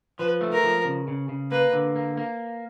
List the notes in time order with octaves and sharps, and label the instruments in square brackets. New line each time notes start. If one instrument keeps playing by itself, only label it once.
[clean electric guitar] F3 [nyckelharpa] B4
[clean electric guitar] A3
[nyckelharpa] A#4
[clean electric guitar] F3
C#3
C#3
C#3
[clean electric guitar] A#3 [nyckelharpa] B4
[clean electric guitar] D3
A#3
A#3